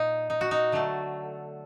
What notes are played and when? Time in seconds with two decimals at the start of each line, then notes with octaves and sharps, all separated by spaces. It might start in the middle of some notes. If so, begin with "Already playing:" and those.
Already playing: A#2 D#4
0.30 D#4
0.41 F#4
0.51 D#4
0.72 D3 F#3 A3